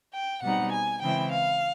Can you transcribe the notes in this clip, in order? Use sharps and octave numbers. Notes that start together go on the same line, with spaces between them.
G5
B2 G3 C4 D#4 F#5
G#5
C#3 E3 G#3 C4 E4 G5
F5